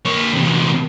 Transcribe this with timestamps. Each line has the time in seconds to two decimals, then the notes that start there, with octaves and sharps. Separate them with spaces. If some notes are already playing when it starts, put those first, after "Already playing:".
0.05 A#3 C#5
0.34 E2 C3